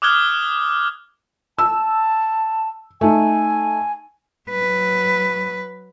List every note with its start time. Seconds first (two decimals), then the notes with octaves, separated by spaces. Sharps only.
0.02 D6 D#6 F6 F#6 G#6 G7
1.59 A5 E6
3.01 A3 D#4 G#5
4.50 F#3 B4